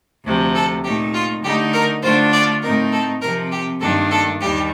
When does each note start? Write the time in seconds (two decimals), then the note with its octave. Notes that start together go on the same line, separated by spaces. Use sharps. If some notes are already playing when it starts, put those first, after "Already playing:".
0.25 D2 C3 F3
0.55 A4
0.84 A#2 A3 D#4 G4
1.14 F4
1.43 D3 A3 D#4 G4
1.73 A#4
2.03 D3 A3 D4 F4 C5
2.33 D5
2.62 A2 A3 C4 D#4 A#4
2.92 A4
3.22 C3 F3 C4 A#4
3.51 G4
3.81 G2 D#3 A#3 D4 A4
4.11 A4
4.40 D#2 D#3 G3 G4